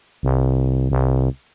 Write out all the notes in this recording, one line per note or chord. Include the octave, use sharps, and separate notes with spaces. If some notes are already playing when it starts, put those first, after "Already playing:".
C2
C2